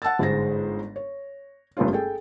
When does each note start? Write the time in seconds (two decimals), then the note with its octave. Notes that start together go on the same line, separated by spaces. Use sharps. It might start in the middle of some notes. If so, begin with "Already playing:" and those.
0.02 F#5 A5 E6 A6
0.19 G1 G#2 G#3 G#4 C5 A#6
0.96 C#5
1.77 F#1 G2 A3 B3 C#4 F4
1.93 G#4 A4 G5